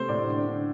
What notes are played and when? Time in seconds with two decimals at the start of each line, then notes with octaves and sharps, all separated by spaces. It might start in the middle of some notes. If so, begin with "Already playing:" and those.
Already playing: C3 A3 C5
0.09 A2 D5
0.27 D3
0.47 D3